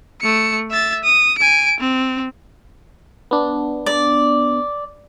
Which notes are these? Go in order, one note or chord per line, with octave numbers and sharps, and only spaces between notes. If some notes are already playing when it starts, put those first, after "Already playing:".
A3 C#7
E5 A6
D#6
G#5 D7
C4
B3 D4
D5